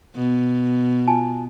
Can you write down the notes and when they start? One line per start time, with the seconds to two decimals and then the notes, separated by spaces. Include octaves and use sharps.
0.15 B2
1.07 F4 G#5 A5